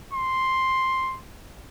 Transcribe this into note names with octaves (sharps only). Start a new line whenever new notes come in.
C6